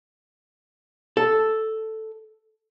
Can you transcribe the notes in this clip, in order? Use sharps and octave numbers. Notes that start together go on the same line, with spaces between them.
A4